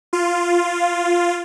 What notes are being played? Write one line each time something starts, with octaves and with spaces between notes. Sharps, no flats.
F4